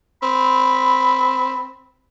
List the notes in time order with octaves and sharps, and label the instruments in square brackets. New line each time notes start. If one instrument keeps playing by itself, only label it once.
[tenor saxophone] C4 [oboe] B5